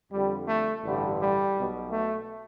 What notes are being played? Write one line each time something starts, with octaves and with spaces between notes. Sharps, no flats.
F2 D3 G3
A3
A1 G2 D3 G3
G3
B1 B2
A3